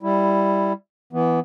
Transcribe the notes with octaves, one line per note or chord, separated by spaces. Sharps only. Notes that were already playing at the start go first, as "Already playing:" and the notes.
G3 E4
E3 B3